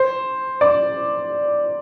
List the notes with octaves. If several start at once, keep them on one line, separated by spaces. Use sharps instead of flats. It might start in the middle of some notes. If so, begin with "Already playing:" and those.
Already playing: C5
D5